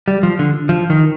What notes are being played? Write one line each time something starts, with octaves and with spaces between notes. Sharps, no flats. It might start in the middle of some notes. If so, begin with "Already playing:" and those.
G3
F3
D3
F3
D#3